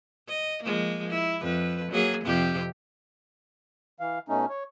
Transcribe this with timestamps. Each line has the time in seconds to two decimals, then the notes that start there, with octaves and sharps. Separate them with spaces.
0.28 D#5
0.63 F3 G#3 A#3
1.09 E4
1.41 F2 B4
1.92 F#3 A#3 G#4
2.24 F2 C3 G4
4.00 E3 F5
4.29 B2 A3 C#4 D#4
4.49 C#5